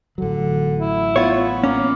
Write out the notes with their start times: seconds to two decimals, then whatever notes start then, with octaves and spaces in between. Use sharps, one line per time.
0.18 A1 D3 F#3
0.79 E4
1.16 B3 F4 C#5
1.64 A#3 C#4